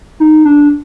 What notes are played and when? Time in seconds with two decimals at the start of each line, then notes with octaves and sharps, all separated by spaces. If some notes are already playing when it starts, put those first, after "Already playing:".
0.20 D#4
0.45 D4